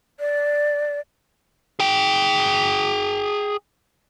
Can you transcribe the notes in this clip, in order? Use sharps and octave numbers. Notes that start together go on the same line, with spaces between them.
D5
G#4 G5